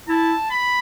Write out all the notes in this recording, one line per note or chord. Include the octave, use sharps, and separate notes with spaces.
E4 A5
B5